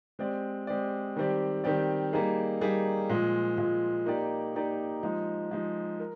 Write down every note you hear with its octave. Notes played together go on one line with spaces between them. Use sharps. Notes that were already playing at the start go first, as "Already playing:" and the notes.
G#3 C4 G4 D5
G#3 C4 G4 D5
D#3 G3 C4 G4 D5
D#3 G3 C4 G4 D5
G3 A#3 D#4 G#4
G3 A#3 D#4 G#4
A#2 F3 G#3
A#2 F3 G#3
A#3 D#4 G4 D5
A#3 D#4 G4 D5
F3 G#3 D#4
F3 G#3 D#4
A#4